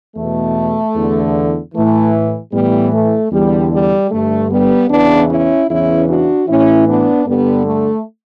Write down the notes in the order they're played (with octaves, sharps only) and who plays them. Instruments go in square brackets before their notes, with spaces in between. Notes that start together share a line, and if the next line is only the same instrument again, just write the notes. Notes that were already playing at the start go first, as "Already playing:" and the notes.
[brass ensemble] E2 B2 A3
E2 D3
A2 E3 A3
A2 E3 G3 B3
A3
E2 D3 G3
G3
G2 D3 A3
G3 B3
E2 C#3 E3 B3 D4
C#4 E4
E2 C#3 E3 C#4 E4
D4 F#4
A2 E3 C#4 E4
B3 D4
G2 D3 G3 B3
A3